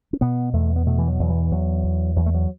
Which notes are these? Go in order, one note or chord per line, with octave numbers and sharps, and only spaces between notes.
C#4
B2 B3
E2 A3
B3
B2 A3
E3
F#3
E2
E3
E2 F#3
E2
E2 F#3
A3
F#3